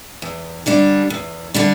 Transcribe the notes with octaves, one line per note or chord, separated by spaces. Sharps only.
E2
D3 G3 D4
E2
D3 G3 D4